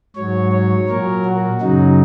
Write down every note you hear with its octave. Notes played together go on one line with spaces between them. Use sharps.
G#2 F#3 C#5
C#5
A#2 F#3 A#4
F#4
F#2 C#3 F#3 D#4